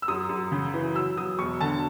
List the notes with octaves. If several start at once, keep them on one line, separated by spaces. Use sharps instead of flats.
E6
F#2 D#6
F#2
C#3
E3
F#3 E6
F#3 D#6
E1 C#6
D3 A5